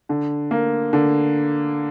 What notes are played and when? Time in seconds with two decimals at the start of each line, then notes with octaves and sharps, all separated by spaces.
0.09 D3
0.51 A#3
0.93 D3